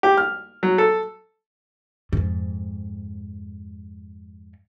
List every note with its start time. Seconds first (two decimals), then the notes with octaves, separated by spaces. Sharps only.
0.03 G4
0.18 F6
0.63 F#3
0.78 A4
2.13 F2 G#2